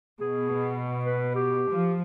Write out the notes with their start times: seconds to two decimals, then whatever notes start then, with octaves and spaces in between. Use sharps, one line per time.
0.21 B2 G#4
1.05 B4
1.35 G4
1.70 F3